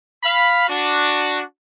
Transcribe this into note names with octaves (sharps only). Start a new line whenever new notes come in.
F5 B5
D4 F#4